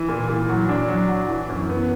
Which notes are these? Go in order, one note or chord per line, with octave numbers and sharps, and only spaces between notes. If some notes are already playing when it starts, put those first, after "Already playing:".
Already playing: E3
A#2
A#2
F#3
D4
F#3
F#3
E3
F#2
B3